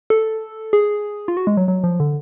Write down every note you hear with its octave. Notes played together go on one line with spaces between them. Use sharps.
A4
G#4
F4
F#4
G#3
F#3
F#3
F3
D3